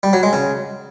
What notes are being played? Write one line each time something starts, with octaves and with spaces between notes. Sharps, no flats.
G3
F#3
G#3
C#3